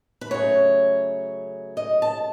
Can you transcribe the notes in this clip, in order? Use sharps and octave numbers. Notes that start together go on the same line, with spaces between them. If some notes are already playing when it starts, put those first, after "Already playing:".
B4
C#3 F#3 A3 C#5
D#5
A5